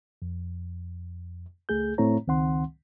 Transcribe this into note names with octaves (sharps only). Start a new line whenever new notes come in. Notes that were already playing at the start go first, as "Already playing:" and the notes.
F2
C#2 A3 G#4 G6
A2 A3 C4 E4 C#5 A#5
C#2 D#3 C4 F#5 C6